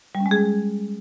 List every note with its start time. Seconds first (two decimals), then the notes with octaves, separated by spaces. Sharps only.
0.15 G3
0.20 C#4
0.26 G#3
0.31 G#4